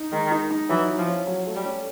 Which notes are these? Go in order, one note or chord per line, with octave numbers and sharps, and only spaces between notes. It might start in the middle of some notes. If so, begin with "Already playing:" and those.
Already playing: D#4
D#3 G#3
D#4
D#4
E3 F#3
E4
F3
C#4
F#3
A3
G3
C#4